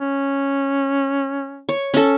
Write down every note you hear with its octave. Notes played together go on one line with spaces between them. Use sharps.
C#4
C#5
C#4 A4